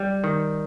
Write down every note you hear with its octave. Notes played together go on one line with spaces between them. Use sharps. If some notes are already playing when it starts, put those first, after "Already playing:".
Already playing: G3
D#3